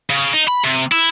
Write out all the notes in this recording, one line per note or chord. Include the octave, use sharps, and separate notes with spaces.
C#3
D#4
B5
C3
E4